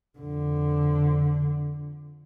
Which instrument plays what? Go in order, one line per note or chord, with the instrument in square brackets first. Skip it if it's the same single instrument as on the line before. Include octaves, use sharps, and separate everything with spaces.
[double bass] F2 D3